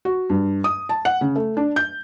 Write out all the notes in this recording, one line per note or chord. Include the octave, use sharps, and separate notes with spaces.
F#4
G2
D#6
A5
F#5
C#3
A3
D4
G6